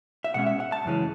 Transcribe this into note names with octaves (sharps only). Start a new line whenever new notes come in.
E5
B2 G#3 C#4 F#5
E5
F#5
A5
F#2 C#3 E3 G#3 C#4